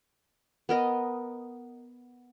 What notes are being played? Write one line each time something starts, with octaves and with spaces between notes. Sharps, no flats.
B3 A#4 D#5